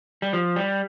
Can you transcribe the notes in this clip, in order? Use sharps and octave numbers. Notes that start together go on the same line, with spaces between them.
G3
F3
G3